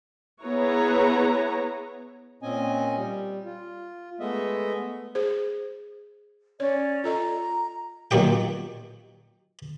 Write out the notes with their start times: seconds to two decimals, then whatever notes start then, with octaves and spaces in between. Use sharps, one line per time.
0.42 B3 E4 G#4 B4 C#5 A#5
2.43 A#2 C4 C#4 D#5 G#5
2.97 G3
3.45 F4
4.20 G#3 A3 B3 D#5 E5
5.15 G#4 C5
6.60 C#4 C#5 D5
7.04 F4 A4 D#5 A#5
8.11 A#2 D#3 F#3 G4 G5